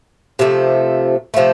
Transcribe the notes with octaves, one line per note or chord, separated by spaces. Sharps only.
C3 F3 A3
C3 F3 A3